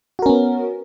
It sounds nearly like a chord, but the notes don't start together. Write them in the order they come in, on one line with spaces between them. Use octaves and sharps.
F#4 A#4 C#4 B3